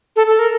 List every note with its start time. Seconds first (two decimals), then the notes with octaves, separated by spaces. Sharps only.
0.16 A4
0.27 A4
0.39 A#4